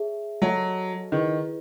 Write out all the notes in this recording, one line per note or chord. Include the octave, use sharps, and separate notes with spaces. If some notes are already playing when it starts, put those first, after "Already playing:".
Already playing: G#4 C#5 E5 A5
F#3 F#4 A4 D#5 A5 C#6
D#3 E4 G#4 B4 D#5